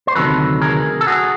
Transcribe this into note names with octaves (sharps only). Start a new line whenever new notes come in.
C5
D2 C3 D#3 F#3 A4 B4
G#4 A#4
A4
F#4 G#4